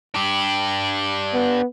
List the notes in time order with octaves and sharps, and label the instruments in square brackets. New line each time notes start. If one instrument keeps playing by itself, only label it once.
[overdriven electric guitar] D4 G4
[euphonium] B3